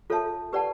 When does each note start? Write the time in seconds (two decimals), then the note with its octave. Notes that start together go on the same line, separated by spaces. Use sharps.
0.10 F4 A4 C#5 E5 A5
0.53 G4 B4 D5 F#5 A5